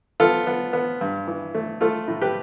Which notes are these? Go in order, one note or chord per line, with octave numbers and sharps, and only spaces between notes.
B3 F4 A4
B3
B3
G2
E3
A3
A3 F4 A4
A2
G4 B4